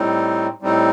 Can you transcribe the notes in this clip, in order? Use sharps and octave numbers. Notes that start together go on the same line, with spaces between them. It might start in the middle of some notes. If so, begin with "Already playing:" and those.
Already playing: A2 G3 C4 D#4
A2 G3 C4 D#4